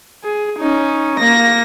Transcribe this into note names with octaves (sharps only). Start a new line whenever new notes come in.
G#4
C#4 D#4
A#3 A#6